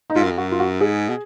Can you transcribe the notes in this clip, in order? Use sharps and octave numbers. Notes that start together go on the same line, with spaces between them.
D#4
G#2 F4
F#2
F2
F#2 F#4
F4
F#4
G#2 G#4
B2